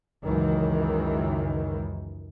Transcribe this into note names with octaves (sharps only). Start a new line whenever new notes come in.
C#2 F#2 D#3 E3